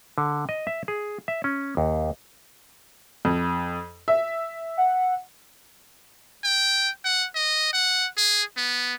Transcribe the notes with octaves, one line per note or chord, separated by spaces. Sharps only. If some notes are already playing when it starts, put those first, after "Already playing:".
D3
D#5
E5
G#4
E5
C#4
D#2
F2
E5
F#5
G5
F#5
D#5
F#5
G#4
B3